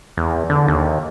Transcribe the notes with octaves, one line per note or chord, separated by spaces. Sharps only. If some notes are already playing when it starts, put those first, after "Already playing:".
E2
D3
D#2